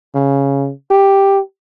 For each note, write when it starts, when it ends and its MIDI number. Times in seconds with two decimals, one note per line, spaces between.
0.15 0.71 49
0.91 1.40 67